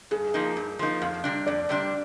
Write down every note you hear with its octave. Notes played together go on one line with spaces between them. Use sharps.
G2 G#4
F3 A#3 D#4
G2
F3 A#3 D#4
F2 F5
C3 G3 D4
F2 D5
C3 G3 D4